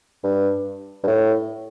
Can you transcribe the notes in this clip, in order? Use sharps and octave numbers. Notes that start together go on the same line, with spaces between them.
G2
G2
A2